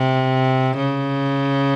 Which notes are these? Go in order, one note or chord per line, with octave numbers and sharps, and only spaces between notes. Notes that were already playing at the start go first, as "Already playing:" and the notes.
Already playing: C3
C#3